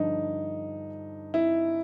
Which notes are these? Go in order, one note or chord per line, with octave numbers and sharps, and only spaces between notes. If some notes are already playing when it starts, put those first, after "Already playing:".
Already playing: G2 D3 F3 D#4
E4